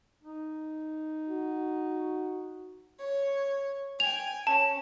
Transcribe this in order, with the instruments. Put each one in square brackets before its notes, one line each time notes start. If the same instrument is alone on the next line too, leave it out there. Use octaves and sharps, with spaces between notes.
[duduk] D#4
[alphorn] F#4
[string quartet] C#5
[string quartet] G5 G#5 [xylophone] F7
[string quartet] C#4 [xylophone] A5